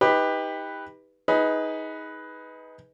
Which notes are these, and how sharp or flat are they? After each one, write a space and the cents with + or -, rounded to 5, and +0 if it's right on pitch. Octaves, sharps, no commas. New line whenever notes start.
D#4 +25 G4 +20 B4 +0
D#4 +25 G#4 +0 B4 +0